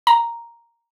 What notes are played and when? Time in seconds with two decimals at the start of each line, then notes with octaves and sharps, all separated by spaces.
0.07 A#5